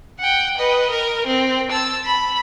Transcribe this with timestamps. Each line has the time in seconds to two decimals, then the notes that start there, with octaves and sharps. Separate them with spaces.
0.19 F#5 G5
0.57 B4 D#5
0.91 A#4
1.26 C4
1.71 A5 E6
2.05 B5